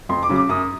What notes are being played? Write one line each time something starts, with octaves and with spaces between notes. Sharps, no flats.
F2 C6
D6
C#3 F#3
D6
F#2 D#6